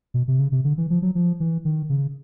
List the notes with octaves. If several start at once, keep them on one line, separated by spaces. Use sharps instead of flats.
B2
C3
C#3
C3
D3
E3
F3
F#3
F3
E3
D#3
C#3